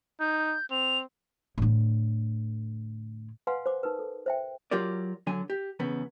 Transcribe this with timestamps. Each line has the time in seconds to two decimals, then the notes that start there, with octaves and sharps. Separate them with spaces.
0.20 D#4 G6
0.71 C4 F7
1.58 A2 D3
3.47 B4 F5 F#5 G#5 C6
3.66 C5 D6
3.83 D#4 A#4 B4
3.99 A4
4.26 C5 E5 G5
4.71 F#3 F4 G4 A#4 D5
5.27 D3 F#3 G#5
5.50 G4
5.80 E2 C#3 B3